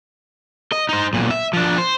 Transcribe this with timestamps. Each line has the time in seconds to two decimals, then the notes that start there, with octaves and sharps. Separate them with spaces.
0.72 D#5
0.89 D#4 C5
1.13 B1 A#2
1.31 E5
1.53 F3 D4
1.78 C5